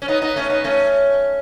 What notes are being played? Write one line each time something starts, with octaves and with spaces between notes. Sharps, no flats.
C#4
B3 D#4
B3 D#4
A3 C#4
B3 D#4
A3 C#4